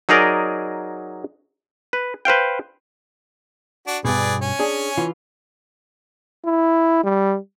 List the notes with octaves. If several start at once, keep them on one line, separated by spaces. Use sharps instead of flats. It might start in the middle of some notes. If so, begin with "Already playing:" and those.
F#3 D#4 G#4 A#4 D5 D#5
B4
B4 C5 F5 G5
D4 F#4
G2 B2 G#4 B4 D5
C#4 G#5
D4 G#4
E3 F4
E4
G3